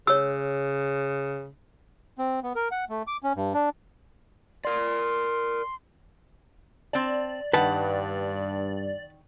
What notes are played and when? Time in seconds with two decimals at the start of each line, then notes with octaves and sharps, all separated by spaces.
0.07 C#3 C#5 E6
2.19 C4
2.43 B3
2.55 A#4
2.71 F#5
2.89 A3
3.07 D6
3.23 C#4
3.36 G2
3.54 D4
4.65 A#4 D5 C6
6.93 C4 D5 A5
7.53 G2 D#3 B4 F#5 A5